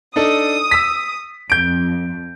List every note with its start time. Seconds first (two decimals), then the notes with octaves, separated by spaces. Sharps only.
0.16 D4 D#4 A4 D#6
0.71 E6 B6
1.50 F2 G6 D7